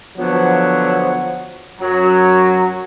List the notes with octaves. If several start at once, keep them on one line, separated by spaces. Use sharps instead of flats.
D3 F3 F#3 B3 C#5 F#5
F#2 F#3